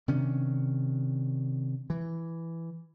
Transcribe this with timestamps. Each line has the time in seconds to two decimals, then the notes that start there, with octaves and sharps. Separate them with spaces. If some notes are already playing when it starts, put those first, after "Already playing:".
0.08 C3 D#3 C#4 D4
1.90 E3